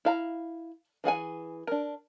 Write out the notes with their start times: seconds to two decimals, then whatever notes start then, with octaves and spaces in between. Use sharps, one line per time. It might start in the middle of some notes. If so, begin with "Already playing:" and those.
0.05 E4 F5 A#5
1.04 E3 G#4 F#5 G#5
1.67 D4 A#4